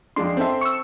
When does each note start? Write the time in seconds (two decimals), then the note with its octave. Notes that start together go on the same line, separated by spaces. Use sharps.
0.16 F2 G#3 D4 C6
0.37 C4 A4 E5
0.61 C#6 E6